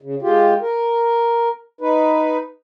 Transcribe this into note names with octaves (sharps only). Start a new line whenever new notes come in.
C#3
G#3 F4 G4
A#4
D#4 B4